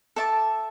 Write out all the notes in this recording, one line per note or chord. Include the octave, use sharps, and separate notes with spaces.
A4 E5 A5 D6